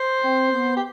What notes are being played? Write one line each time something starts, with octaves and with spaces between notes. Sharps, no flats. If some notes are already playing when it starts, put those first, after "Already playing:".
Already playing: C5
C4
B3
G4